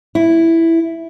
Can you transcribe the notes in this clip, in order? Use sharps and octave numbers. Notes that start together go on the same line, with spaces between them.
E4